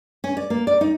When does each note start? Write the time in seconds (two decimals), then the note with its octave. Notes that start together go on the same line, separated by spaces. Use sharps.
0.24 C#4
0.37 D5
0.50 A#3
0.67 D5
0.81 D#4